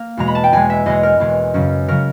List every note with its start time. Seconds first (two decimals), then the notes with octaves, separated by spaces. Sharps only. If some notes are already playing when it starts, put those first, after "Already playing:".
Already playing: A#3
0.17 E2 B2 G#3 A#5
0.28 B5
0.35 A5
0.44 G5
0.52 E2 B2 G#3 G#5
0.70 E5
0.86 E2 B2 G#3 D#5
1.03 A#4
1.20 E2 B2 G#3
1.54 F#2 C#3 F#3
1.88 C#3 F#3 A#4